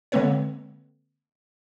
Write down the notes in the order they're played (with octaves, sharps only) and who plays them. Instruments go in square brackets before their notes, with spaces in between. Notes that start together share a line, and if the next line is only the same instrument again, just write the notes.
[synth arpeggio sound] D3 G#3 A#3 C4 B4 C#5